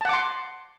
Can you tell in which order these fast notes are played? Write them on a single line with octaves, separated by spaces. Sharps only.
A5 F#5 D6 C6